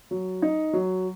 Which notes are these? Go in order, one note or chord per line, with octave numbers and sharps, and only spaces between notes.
F#3
D#4
F#3